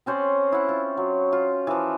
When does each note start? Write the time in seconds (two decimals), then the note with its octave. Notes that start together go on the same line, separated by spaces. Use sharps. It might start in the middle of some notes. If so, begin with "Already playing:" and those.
0.06 C4 C#4 C5 D5
0.52 E4 F#5
0.69 F4
0.97 F#3
1.32 F4
1.67 E3 F3